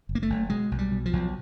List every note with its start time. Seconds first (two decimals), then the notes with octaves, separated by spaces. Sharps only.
0.09 F#1
0.15 A#3
0.23 A3
0.30 F#1
0.50 B2 G#3
0.71 B1
0.79 G3
0.92 B2
1.06 F3
1.13 B1